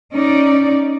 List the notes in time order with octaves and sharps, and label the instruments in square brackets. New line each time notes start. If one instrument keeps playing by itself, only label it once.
[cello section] C#4 D#4 D5